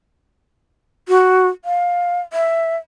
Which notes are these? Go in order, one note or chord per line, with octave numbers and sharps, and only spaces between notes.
F#4
F5
E5